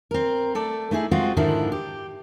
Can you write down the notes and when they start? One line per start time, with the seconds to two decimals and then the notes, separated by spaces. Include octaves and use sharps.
0.11 C4 A#4
0.55 A3 A4 D5
0.91 A3 D#4 E4 G#4
1.11 G#3 C4 F4 F#4
1.37 G#2 D3 D#3 F3 D4 E4
1.72 G4